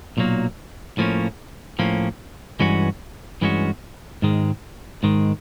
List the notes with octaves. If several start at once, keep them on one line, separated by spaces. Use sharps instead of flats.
B1 A#2 F#3 A#3
A2 F3 A#3 C#4
A2 F3 A#3 C#4
G2 E3 G#3 C#4 F#4
G2 E3 G#3 C#4 F#4
G#2 D#3 G#3
G#2 D#3 G#3